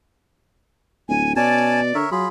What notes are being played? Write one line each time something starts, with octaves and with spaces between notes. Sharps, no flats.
D1 G#5
B2 C#4 D5 G#5 A5
D3 A#4 C#5 E5
F#3 F4 G#4 B5